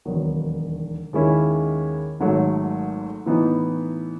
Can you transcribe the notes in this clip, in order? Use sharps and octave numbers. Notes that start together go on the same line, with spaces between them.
E1 D#2 D#3 F#3 B3
D#2 D#3 G#3 C#4 E4
G#1 G#2 F#3 A3
A2 E3 B3 D#4